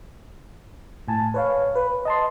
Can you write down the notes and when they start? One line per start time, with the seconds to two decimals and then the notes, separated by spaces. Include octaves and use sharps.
1.08 A2 G#5 A5
1.34 B4 C#5 F5
1.76 B4
2.05 D#5 A5 C6